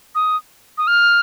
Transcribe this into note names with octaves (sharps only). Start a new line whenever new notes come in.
D#6
D#6
F6